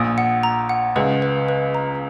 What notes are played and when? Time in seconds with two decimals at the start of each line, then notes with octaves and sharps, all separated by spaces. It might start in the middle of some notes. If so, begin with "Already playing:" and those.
Already playing: A#1 A#2 D#6
0.18 F#5
0.43 A#5
0.69 F#5
0.96 C#2 C#3 B4
1.22 B4
1.49 B4
1.75 A#5